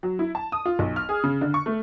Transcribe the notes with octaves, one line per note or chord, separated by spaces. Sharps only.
F#3
E4
A5
D#6
F4
B1
F6
G#4
C#3
D3
C#6
A3